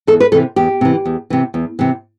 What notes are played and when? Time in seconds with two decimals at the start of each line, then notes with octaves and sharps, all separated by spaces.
0.07 E2 A4
0.20 B4
0.32 C3 E3 A4
0.56 E2 G4
0.81 C3 E3
1.05 E2
1.30 C3 E3
1.54 E2
1.79 C3 E3